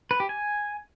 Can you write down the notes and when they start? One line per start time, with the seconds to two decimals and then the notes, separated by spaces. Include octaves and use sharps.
0.11 B4
0.20 G4
0.29 G#5